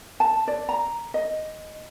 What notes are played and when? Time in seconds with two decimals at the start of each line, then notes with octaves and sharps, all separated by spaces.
0.20 A5
0.48 D5
0.69 A#5
1.14 D#5